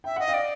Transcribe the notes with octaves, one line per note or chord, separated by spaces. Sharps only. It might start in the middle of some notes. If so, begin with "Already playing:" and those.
E5 G5
D#5 F#5
F5 G5
D5